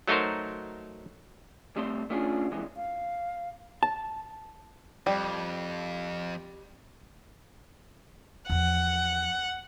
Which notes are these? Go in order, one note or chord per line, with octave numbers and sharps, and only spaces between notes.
F#3 A3 D#4 F#4 A#4 C5
C2 G3 A3 C4 C6
A3 C#4 D4 F4 G#4
G2 C3 E3 G#3
F5
A5
F2 G3
E2 F3 F#5